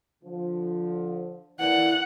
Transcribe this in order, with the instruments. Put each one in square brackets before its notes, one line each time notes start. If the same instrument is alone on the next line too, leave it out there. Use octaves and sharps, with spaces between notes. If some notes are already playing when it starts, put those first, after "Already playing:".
[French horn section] D3 F3
[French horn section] E3 A#3 D5 [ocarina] E4 [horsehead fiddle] F#5